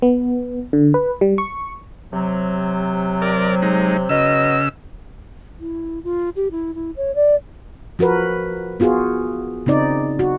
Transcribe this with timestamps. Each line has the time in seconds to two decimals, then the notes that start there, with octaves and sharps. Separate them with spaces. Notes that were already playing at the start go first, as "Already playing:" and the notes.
0.02 B3
0.73 D3
0.94 B4
1.21 G3
1.38 C#6
2.12 C3 F#3
3.22 A#4 D5
3.62 G#3 D#4
4.09 C#3 F#3 B3 D#5 E6
5.60 E4
6.04 F4
6.36 G4
6.51 E4
6.74 E4
6.97 C#5
7.15 D5
7.99 F3 F#4 A#4 B4
8.80 B3 F4 F#4 G#4
9.66 C#3 C4 D#4 D5
10.19 F#4